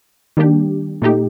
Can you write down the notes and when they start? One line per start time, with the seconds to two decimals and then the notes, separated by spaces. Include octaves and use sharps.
0.37 D#3 G3 A#3 D4 G4
1.02 A#2 A3 D#4 G4